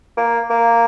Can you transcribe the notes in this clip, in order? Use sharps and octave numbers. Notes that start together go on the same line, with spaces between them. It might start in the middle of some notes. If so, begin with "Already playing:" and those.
A#3
A#3